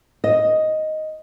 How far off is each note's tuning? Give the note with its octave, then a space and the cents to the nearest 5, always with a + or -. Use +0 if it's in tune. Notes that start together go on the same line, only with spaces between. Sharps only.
D#5 +5